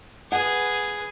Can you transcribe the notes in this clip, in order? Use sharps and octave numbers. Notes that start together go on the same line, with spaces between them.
G#4 B4 F#5